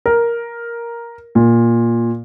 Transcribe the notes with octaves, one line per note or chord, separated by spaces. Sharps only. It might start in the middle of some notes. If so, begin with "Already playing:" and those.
A#4
A#2